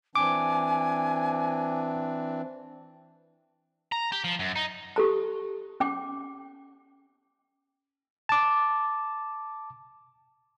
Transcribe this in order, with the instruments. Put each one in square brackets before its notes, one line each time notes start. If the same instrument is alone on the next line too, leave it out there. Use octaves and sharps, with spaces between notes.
[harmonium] E3 C4 D4 [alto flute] G#5 [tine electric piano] D6
[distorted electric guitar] A#5
G4
F3
F#2
D#4
[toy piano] G4 A4 A#5
C#4 G5 D6
[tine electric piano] A5 D6